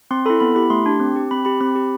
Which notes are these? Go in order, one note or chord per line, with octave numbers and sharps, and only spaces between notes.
C4 C6
E4 A4 B5
B3 B5
E4 G4 B5
A3 C6
D4 G4
C4
G4
C4 B5
G4 B5
C4 B5
G4